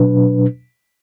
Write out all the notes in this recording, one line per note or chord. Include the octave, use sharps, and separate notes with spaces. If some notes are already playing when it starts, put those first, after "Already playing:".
Already playing: B2 F#3 D4 B4